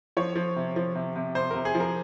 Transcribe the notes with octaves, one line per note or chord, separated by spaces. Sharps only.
F3 C#5
F3
C3
F3
C3
C3
C3 C5
C3 A#4
G#4
F3
A#4